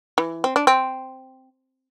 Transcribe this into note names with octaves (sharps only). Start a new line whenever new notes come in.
E3
C4
D4
C4